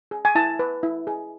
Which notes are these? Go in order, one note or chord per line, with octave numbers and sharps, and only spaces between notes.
G#4
G#5
E4 A5
B4
E4
G#4